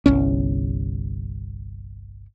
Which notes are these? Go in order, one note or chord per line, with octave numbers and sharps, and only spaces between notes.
G1 C2 C#4